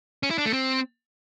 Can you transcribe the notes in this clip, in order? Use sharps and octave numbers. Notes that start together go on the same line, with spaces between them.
C#4
E4
D4
A3
C4